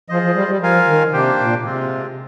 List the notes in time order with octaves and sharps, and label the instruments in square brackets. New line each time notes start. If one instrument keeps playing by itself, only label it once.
[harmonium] F3 [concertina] F4 G#4 C5 D#5
[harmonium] F3
G3
G3
[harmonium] F3 [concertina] F4 A#4 F5 G#5
[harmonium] D#3
[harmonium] C3 [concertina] A#3 D4 G4 C5 G5
[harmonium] A#2
A#2
[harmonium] C3 [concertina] G#3 C4 F4